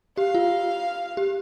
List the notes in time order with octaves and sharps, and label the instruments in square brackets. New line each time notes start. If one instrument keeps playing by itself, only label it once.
[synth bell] G4 [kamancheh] F5
[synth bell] F4
G4